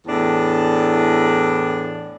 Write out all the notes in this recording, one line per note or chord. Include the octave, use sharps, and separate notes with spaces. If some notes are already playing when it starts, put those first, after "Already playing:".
E2 A2 D4